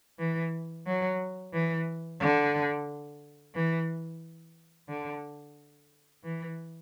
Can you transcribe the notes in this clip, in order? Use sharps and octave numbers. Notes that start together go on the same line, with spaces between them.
E3
F#3
E3
D3
E3
D3
E3